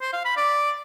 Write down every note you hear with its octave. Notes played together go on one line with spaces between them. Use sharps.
C5
F5
B5
D5